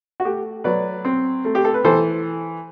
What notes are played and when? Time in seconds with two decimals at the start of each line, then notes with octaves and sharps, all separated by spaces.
0.20 F#4
0.25 A3 G4
0.64 F#3 B4 D5
1.05 C4
1.45 A3
1.55 G4
1.65 A4
1.74 B4
1.84 E3 A4 C5